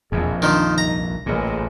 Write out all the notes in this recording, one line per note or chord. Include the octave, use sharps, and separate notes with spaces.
E1 A#1 F2 F3 G#4
D#3 F3 D4 D#4
C2 A#5
A1 A#2 G#3 A#3